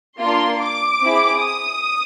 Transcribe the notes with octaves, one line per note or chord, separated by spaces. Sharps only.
A#3 D4 F4 C6
D6
C4 E4 G#4
D#6